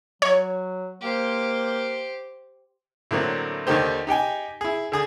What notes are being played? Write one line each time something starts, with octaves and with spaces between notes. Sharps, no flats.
F#3 C#5
A#3 G4 C5
A2 D3 F#3 A#3 C4
D#2 D3 D#3 D#4 G4 C5
D#4 G4 G5 G#5
E4 G#4
D3 G#4 D#6